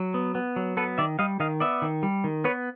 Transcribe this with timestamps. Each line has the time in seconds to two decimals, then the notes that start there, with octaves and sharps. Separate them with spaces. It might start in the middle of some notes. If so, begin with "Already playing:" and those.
Already playing: F#3
0.14 B3
0.35 B3
0.56 F#3
0.77 B3 A4 B4
0.98 D#3 D5 E5
1.19 G3 D#5 F5
1.40 D#3 D#5 F5
1.60 B3 D5 E5
1.82 D#3
2.03 G3
2.24 D#3
2.44 B3 B4 C#5